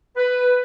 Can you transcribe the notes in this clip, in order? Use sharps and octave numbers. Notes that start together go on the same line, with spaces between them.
B4